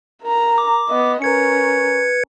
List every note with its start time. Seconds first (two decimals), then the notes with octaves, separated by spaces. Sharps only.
0.23 A#4 A#5
0.58 D6
0.89 B3 D#5
1.22 C#4 A#4 B4 G#6 C#7